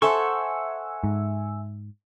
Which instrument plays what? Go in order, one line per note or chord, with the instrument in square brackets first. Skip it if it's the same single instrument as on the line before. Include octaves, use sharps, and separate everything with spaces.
[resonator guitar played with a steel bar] A4 C5 [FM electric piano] E5 G#5 E6 [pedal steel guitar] F#5 C#6
[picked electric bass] G#2